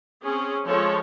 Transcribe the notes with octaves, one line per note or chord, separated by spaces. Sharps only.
C4 C#4 G#4
F3 G#3 A4 C#5